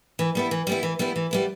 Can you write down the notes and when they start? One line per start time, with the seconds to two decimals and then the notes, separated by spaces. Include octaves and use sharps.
0.19 E3
0.35 G3 B3 E4
0.51 E3
0.67 G3 B3 E4
0.83 E3
0.99 G3 B3 E4
1.16 E3
1.31 G3 B3 E4